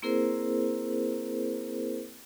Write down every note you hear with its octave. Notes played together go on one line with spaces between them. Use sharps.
A#3 C4 E4 G#4 A#4 C5